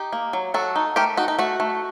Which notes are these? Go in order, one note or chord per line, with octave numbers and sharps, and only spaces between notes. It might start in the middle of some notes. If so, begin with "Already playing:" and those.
Already playing: D#4 G4
A#3
F#3
F#3 F#4 A4
D#4
A3 G4 A#4
D#4 F#4
D#4
A3 F#4
A3